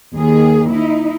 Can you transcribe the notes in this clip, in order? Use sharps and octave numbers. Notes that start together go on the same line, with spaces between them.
D#2 D#3 G#4
D#4 E4